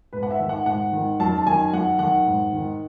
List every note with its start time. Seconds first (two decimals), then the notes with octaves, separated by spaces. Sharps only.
0.13 G#2 B4
0.23 F#5
0.31 E5
0.40 D#3
0.49 F#5
0.66 G#2 F#5
0.93 D#3
1.20 F#2 A5
1.37 A5
1.46 D#3 G#5
1.73 F#2 F#5
1.99 D#3 F#5
2.26 G#2
2.53 D#3